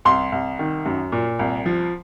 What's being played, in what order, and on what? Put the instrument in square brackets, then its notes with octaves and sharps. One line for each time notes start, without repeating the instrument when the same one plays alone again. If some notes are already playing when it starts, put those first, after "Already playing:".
[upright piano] C2 C6
C2
D#3
F#2
A#2
C2
F3